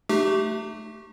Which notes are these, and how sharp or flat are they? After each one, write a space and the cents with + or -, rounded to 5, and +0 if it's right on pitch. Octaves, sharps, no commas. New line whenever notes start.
A3 +0 D#4 -45 G4 -20